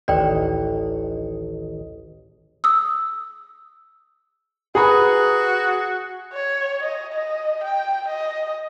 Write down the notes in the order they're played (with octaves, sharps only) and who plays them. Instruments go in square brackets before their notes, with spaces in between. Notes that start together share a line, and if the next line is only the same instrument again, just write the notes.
[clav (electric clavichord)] A1 [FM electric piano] D2 D#3 D#5 [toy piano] D5 G5
[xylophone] D#6 E6
[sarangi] F#4 [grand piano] G#4 [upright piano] B4 A#5 B5
[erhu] C#5
D#5
D#5
G5
D#5